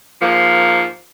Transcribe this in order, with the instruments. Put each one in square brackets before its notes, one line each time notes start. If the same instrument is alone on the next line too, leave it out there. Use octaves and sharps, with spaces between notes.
[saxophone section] G#2 F3 A#3